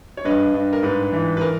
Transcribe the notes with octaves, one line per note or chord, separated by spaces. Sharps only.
C#5
G2 B4 D#5
G2
A#4
G#2 B4
E3
B4
A#4